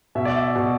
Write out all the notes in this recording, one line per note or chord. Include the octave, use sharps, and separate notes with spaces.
B2 E5
D5
E5
B2